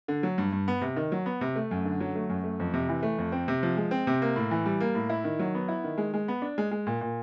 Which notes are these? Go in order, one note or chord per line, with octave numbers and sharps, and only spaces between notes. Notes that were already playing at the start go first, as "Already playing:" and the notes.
D3
F#3
G2
G2
B3
C3
D#3
F#3
B3
C3
A3
F#2
D3
F#3
A3
F#2
A3
F2
C3
E3
A3
F2
C4
C3
F3
G#3
C4
C3
A#3
A2
E3
G3
A#3
A2
E4
D#3
F#3
B3
E4
D#3
G#3
G#3
B3
D4
G#3
G#3
A#2
A#2